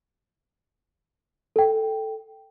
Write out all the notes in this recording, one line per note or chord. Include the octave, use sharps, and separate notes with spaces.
A4 G5